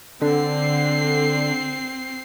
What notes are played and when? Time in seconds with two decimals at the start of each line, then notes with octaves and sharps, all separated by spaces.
0.21 D3 C4 C7